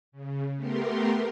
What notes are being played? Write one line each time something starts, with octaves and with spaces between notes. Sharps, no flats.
C#3
A3 B3 G4 A#4 C6